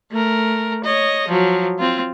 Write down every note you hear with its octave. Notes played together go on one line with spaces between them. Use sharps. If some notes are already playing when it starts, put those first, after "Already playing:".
A3 A#4
C#5 D#5
F3 F#3
C4 F4